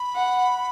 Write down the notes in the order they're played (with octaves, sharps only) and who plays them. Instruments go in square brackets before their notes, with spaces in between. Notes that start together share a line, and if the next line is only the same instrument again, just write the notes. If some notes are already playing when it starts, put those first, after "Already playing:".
Already playing: [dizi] B5
[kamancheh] F#5